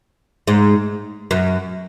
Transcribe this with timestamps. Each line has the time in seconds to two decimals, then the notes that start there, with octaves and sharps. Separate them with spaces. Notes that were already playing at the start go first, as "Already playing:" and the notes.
0.47 G#2
1.31 F#2